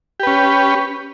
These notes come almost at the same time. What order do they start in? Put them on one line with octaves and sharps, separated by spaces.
G4 B4 C#4